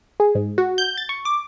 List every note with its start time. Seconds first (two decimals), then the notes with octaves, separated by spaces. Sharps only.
0.20 G#4
0.35 G#2
0.58 F#4
0.78 G6
0.97 A6
1.09 C#6
1.25 D6